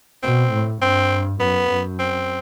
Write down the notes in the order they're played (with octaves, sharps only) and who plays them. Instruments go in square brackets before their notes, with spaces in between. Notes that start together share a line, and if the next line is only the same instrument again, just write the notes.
[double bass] B2 [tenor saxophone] C4
[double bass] A2
[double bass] G2 [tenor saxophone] C4
[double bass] F#2 [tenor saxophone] B3
[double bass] F#2
[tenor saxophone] C4